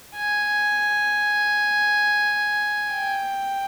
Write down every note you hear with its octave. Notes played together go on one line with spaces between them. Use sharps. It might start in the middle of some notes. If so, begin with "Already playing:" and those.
G#5
G5